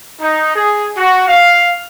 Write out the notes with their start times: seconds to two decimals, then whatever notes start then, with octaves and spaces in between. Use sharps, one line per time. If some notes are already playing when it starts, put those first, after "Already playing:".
0.21 D#4
0.55 G#4
0.97 F#4
1.28 F5